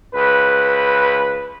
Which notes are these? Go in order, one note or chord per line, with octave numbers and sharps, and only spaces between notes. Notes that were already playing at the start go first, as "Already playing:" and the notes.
C#2 B4